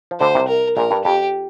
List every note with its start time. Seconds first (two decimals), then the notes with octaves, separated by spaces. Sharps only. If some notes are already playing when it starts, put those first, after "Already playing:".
0.11 F3
0.20 D2 D3 C5
0.35 C2 C3
0.48 A#4
0.77 A#1 A#2 A#4
0.91 G2
1.04 F2 G4